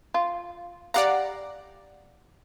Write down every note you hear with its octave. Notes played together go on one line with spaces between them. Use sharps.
F4
G4 D5 F5 F#5 A#5